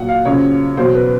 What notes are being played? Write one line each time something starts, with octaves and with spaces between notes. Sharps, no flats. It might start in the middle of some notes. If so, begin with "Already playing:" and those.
Already playing: A#2 F#3 F#5
F5
F#2 C#3 F3 C#5
E2 B2 F#3 C5
B4